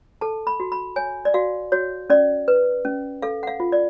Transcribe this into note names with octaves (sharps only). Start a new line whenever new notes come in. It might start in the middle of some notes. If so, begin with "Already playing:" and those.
A4 A5
B5
F#4
B5
C#5 G#5
D5
F#4 F5
F#4 C#5
C#4 D5
B4
C#4
A4 F5
F#5
F5
F4
D5